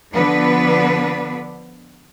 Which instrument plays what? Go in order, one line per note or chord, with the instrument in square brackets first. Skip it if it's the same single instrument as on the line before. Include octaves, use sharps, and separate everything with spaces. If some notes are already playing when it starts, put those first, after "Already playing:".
[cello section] D3 F3 B3 D4 B4